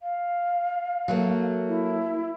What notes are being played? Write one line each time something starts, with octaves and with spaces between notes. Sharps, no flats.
F5
F#3 A3 A#3
E4